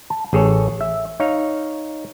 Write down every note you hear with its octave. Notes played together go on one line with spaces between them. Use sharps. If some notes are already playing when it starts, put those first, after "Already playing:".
A5
A1 G#4 A4 C#5
E5
D#4 C#5 F5